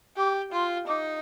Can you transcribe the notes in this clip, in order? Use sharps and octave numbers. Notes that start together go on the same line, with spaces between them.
G4 D6
F4 C6
D#4 D6